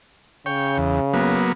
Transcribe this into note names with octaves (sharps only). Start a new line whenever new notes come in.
C#3 C#5 G5
E2
F#3 A#3 B3